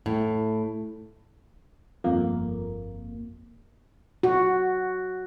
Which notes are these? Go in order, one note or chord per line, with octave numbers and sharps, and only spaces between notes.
A2
G1 F2 A#3
F#4